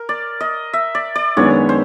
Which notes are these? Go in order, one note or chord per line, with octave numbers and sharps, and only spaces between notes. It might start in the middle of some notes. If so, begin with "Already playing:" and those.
Already playing: A#4
D5
D#5
E5
D5
D5
F#2 D#3 G#3 B3 D4 C#5
C5